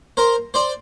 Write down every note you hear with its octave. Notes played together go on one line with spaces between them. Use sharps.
A#4 C5
C5 D5